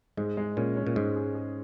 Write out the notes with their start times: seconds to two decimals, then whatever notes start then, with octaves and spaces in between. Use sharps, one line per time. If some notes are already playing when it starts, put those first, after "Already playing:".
0.17 G#2 G#3
0.37 G#3
0.57 A#2 C#4
0.76 C#4
0.87 A#2
0.96 G#2 G#3
1.16 G#4
1.35 G#4